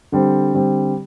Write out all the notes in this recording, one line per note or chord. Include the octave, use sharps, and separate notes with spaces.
D3 G3 C4
D3 G3 C4